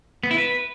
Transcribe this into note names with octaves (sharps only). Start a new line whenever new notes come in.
B3
E4
B4